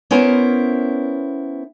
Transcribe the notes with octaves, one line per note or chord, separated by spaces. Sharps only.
B3 C#4 E4 A#4 C5